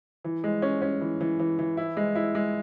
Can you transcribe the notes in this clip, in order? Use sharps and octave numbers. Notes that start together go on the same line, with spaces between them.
E3
G#3
C#4
C#4
E3
E3
E3
E3
E4
G#3
E4
G#3